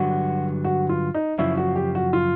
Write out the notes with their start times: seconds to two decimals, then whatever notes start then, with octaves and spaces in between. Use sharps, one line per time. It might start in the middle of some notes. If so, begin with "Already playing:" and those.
Already playing: G2 D3 F#3 F#4
0.65 F#4
0.89 F4
1.14 D#4
1.38 F#2 C#3 F3 E4
1.57 F#4
1.76 G4
1.95 F#4
2.13 F4